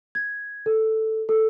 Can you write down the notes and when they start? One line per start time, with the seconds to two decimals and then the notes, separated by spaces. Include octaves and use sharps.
0.15 G#6
0.66 A4
1.29 A4